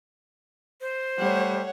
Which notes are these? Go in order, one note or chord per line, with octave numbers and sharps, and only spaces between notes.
C5
G3 A3 C#5 F#5